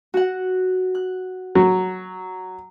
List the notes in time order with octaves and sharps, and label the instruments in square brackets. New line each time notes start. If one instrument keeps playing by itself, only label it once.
[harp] F#4 F#5
F#6
[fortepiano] F#3